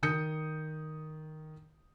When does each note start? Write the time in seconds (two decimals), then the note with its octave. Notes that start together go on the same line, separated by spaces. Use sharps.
0.03 D#3 D#6 G6 C#7